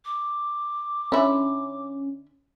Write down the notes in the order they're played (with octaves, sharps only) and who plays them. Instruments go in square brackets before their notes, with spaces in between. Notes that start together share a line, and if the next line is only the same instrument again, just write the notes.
[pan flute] D6
[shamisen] D3 E4 [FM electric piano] C#4